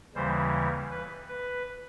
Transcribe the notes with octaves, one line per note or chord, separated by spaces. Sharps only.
D#2 C#3 E3 G3 C5
B4
B4